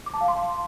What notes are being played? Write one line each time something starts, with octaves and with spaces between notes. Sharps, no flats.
D6
A5
F5
C6